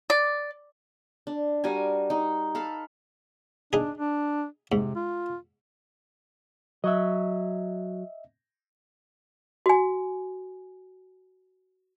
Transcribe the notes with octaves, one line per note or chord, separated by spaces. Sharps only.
D5
D4
G3 F#4 A#4 G#5
D#4
A4 F5 B5
D4 D#4 G#4
D4
G#2 C3
F4
F#3 D#5 E5
F#4 G#5